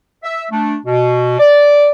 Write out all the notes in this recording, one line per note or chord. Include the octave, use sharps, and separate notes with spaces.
E5
A3 D4
B2
D5